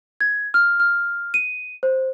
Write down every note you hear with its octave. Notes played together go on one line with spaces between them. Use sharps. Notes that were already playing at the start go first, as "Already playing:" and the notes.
G#6
F6
F6
D#7
C5